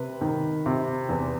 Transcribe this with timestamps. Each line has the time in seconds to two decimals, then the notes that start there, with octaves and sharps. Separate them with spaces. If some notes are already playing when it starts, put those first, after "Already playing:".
Already playing: C3 B4
0.21 D#3
0.66 C3
1.09 E2